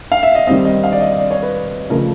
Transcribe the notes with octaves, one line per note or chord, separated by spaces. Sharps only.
F5
E5
D#5
D#3 G3 C4 D#5
D#5
F5
D5
D#5
D5
C#5
B4
C#3 F3 A3 A#4